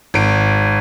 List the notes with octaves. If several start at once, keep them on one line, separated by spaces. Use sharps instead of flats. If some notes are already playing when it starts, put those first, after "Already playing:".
G#1 D7